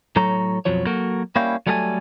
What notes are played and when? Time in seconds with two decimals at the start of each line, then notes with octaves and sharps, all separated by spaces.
0.16 A2 F#3 A4 C#5 A#5
0.65 B1 F2 F3 F#3 C#5
0.86 F#3 A#3 F#4 A4 A#4
1.36 G3 A#3 C#4 E4 F5 G5
1.67 F#3 G3 A3 A4 E5 G#5